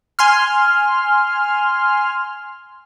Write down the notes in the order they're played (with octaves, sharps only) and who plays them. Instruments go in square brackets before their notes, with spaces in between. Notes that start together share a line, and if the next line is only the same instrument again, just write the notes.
[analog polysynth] G#5 C6 F6